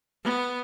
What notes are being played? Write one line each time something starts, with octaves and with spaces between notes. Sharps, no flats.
B3